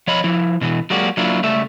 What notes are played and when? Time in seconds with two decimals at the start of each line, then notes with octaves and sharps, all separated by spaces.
0.07 F3 C#5 D#5 B5
0.24 F3 E4
0.61 B2 E3
0.90 F#3 G#3 A#3 F#4 G4 D5
1.17 F#3 A#3 D4 E4 F4
1.43 C#2 G3 A3 E5